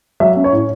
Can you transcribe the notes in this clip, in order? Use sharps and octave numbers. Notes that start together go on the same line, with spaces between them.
F#3 E5
C#4
C#5
A2